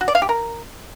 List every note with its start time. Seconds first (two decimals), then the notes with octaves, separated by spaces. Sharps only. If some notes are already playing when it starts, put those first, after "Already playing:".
0.01 F#4
0.08 D5
0.15 F5
0.22 G4
0.29 A#4